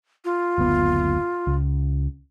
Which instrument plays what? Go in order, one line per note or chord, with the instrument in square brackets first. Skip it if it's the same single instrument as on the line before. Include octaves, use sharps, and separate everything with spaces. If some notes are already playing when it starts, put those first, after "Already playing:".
[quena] F4
[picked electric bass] F#1 D2 B3
C#2